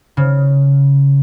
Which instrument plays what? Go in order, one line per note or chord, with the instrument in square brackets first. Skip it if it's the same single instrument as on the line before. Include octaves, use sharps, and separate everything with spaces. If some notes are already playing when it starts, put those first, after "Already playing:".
[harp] C#3